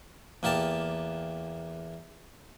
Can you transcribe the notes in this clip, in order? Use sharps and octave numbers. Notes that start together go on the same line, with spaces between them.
E2 A#3 G4 A5